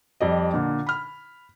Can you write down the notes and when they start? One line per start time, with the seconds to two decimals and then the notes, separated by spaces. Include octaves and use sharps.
0.20 F2 G3 D5 D#5
0.54 A#2 D3
0.87 B5 F6